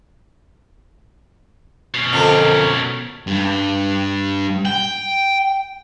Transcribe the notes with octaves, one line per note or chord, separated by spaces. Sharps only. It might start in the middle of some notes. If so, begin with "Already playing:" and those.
B2 C#4
F2 D3 F3 A#4
G2
G5